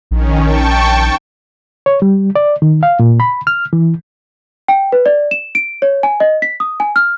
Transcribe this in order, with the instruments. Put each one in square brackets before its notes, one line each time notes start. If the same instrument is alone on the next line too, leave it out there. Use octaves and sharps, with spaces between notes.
[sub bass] A#1 [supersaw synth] D#3 C#4
[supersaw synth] G5 A5 C#6
[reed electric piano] C#5
G3
D5
D#3
F5
A#2
B5
F6
E3
[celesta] G5
B4
D5
E7
D7
C#5
G#5
D#5
B6
D#6
G#5
F6